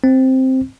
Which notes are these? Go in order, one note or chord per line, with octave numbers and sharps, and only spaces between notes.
C4